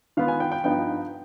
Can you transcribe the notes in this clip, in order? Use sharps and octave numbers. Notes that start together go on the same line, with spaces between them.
D#3 B3 F4 F5
G#5
G5
G5
G2 F3 B3 D#4 G5